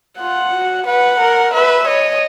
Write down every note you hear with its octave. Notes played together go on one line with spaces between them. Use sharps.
F4 F#5
F#4
B4 F#5
A#4
B4 E5
C#5 D#5